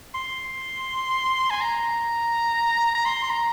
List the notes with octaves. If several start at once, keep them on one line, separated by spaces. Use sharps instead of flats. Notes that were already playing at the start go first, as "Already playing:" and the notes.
C6
G#5
A#5
A#5
C6
C6
A#5